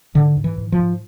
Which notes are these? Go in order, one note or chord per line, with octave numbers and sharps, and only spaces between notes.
G#2 D3
G#2
E3
G#2
F3
G#2